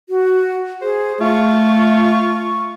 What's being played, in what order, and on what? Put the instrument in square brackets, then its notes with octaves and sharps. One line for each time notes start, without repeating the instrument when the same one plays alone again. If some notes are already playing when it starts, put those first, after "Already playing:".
[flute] F#4
[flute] G#4 [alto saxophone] C5
[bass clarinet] A3 [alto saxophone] F4 [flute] C#6